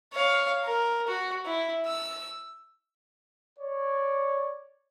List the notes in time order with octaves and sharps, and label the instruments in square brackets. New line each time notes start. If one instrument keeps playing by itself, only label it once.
[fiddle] C#5 F5
A#4
F#4
E4
E6
[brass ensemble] C#5 D5